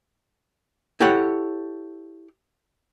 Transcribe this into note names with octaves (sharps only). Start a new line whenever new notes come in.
E4 G4 A4 C#5 F#5